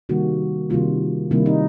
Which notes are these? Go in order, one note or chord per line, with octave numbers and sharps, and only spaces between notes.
C3 D#3 G3 A#3 F#4
C3 D#3 G3 A#3 F4
C3 D#3 G3 A#3 E4
D#4